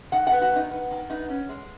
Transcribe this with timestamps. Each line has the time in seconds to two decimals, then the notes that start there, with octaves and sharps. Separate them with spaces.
0.12 D#3 F#5
0.27 F#5
0.31 B3
0.42 F#4
0.51 D#3 D#4
0.71 B3
0.91 D#3
1.10 B3 D#4
1.29 C#4
1.49 G#3